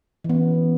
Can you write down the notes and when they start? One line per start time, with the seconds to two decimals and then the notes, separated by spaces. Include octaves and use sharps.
0.24 E3
0.30 B3
0.35 C#4